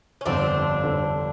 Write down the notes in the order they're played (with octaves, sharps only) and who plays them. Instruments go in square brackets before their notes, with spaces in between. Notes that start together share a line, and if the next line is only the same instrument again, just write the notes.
[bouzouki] C#4
[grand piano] G1 F2 D3 [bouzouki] C4 D4
[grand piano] G1 F2 D3